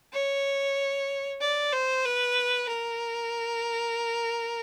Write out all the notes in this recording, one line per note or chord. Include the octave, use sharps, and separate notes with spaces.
C#5
D5
C5
B4
A#4